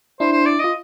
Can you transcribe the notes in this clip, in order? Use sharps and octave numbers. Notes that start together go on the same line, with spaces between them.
D4 E4 C5
C5
D5
F4 D#5